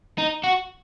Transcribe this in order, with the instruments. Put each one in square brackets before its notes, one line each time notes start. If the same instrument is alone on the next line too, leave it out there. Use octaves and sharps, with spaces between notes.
[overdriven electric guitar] D#4
F#4